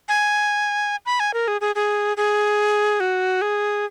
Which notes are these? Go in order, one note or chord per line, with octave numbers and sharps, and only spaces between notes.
G#5
B5
G#5
A#4
G#4
G#4
G#4
G#4
F#4
G#4